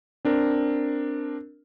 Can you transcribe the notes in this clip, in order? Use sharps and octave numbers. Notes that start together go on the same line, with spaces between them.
C4 D4 A#4